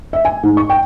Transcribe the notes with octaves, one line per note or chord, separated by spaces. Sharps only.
E5
G#5
G#2
C#6
G5